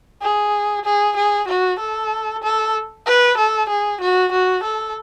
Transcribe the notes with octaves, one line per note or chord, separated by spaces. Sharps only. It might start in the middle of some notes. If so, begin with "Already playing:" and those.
G#4
G#4
G#4
F#4
A4
A4
B4
A4
G#4
F#4
F#4
A4